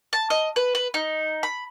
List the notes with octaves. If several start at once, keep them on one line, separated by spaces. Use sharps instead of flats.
A5
D#5
B4
B4
D#4
B5